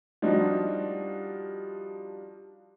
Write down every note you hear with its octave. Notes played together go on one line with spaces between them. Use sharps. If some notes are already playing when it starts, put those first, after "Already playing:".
F3 G3 D4 D#4 F4 F#4